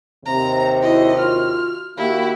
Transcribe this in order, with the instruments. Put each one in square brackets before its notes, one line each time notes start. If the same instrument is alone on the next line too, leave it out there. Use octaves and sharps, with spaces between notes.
[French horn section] D#2 C3 [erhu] A#5
[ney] E4 [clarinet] F#4 [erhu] D#5
[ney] F4 [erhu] F6
[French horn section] D#3 F#4 G4 [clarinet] A#3 [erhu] E4 [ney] F5